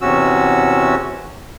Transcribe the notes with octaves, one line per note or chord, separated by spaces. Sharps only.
E2 C3 C#4 F#4 E6